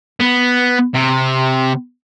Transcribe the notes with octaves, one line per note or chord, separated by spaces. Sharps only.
B3
C3